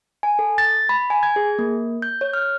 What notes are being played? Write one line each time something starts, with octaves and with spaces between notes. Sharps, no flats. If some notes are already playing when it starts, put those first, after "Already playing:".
G#5
A4
A6
B5
G#5
G#6
G#4
A#3
G6
C#5
F6